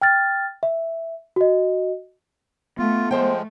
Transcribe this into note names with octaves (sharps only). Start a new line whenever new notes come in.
G5 F6 A6
E5
F#4 D#5
A3 B3 F4
F3 G#3 C5 G5